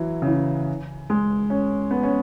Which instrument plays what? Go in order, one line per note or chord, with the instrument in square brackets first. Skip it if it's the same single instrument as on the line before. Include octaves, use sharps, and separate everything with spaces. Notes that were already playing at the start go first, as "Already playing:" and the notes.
Already playing: [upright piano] E3 F#3
C#3
E3
G#3
C#4
B3
C#4